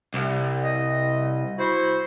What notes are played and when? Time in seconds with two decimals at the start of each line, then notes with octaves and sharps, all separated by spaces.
0.14 C2
0.64 D#5
1.58 E4 F#4 C5